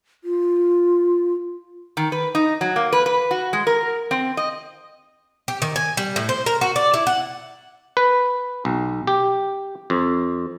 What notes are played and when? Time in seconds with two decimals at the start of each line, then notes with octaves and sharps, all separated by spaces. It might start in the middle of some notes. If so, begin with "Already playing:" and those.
0.24 F4
1.97 D#3
2.12 B4
2.35 D#4
2.61 F#3
2.76 A#3
2.92 B4
3.06 B4
3.31 F#4
3.53 G#3
3.67 A#4
4.11 C4
4.37 D#5
5.48 G4
5.62 D#3
5.76 G#5
5.97 G3
6.16 A2
6.29 C5
6.46 A#4
6.61 F#4
6.76 D5
6.94 E4
7.07 F#5
7.97 B4
8.65 B1
9.07 G4
9.90 F2